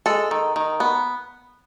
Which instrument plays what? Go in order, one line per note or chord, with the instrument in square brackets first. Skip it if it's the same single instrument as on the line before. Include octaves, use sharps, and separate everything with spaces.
[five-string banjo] G#3 A4
D#3
D#3
B3